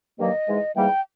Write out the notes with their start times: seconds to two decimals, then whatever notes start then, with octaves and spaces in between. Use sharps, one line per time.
0.18 G2 D#3 F#3 A#3 D#5
0.47 G#2 E3 G#3
0.76 G#2 E3 G3 A#3 G5